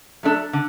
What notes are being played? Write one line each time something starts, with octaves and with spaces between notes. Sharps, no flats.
F#3 A3 D4 A4
D3